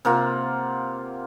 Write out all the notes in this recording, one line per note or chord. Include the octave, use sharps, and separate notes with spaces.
C3 A#3 F4 F#5